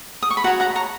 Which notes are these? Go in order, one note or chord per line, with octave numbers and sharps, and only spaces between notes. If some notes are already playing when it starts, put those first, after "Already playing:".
D#6
C#6
B5
F#4 C#5 F#5 A#5
F#5 A#5
A#5 C#6